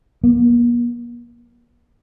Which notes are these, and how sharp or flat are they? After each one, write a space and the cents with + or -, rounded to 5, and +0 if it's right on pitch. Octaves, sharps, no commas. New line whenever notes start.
A#3 +45